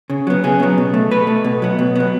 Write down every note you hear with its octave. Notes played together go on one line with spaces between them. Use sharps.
C#3
F#3 B3
C#3 G#4
F#3 B3
B2
A3
B2 B4
A3
B2
F#3 B3
B2
F#3 B3